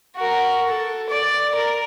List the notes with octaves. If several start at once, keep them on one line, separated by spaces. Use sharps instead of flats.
F#4 A#4
A4
D5
A#4